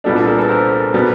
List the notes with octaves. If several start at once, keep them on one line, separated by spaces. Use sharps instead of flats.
C2 A#2 G3 B3 D4 A4
A4
G#4 A#4
A4 B4
A#4 C5
B2 G3 B3